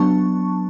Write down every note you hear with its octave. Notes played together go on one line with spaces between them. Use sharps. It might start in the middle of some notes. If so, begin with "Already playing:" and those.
Already playing: F#3 B3 D4 A5 C#6